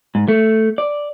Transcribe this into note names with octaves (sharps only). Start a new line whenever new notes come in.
G#2
A3
D5